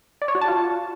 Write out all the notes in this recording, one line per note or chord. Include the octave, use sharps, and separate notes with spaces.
D5
C#5
F#4
A5
F4